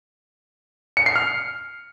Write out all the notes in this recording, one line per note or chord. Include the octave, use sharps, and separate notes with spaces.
C#7
C7
F6